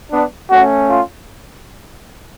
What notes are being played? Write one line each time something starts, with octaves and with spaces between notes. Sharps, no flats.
B3 D4
A3 C#4 F#4
F4